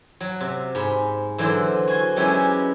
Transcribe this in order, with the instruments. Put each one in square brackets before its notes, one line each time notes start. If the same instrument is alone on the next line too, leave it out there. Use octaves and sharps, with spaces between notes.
[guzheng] F#3
C3
G#2 B5
D3 E3 F#3 C5
F#4 G#5 C6
F#3 G#3 B3 C#4 E4 G4